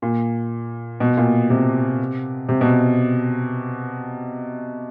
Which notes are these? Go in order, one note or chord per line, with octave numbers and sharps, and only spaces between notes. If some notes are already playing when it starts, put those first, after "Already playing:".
A#2
B2
A#2
C3
C3
B2